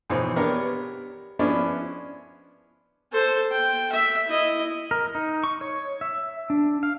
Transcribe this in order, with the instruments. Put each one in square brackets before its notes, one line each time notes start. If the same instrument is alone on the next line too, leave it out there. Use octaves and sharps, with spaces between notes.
[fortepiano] F2 B2 E3 C4 D#4 C#5
B3 D4 G4 A#4 B4 C#5
F3 B3 C#4 D4 E4
[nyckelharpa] A4 C5
G5
E5
E4 D#5
[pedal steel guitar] A#4
D#4
C#6
C#5
E5
D4
F5